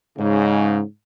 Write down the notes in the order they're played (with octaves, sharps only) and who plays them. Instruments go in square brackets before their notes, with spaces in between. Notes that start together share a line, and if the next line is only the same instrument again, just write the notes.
[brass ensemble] G#2 C#3